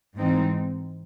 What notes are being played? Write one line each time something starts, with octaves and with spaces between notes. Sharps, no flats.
G#2 E3 G#3 C4 D#4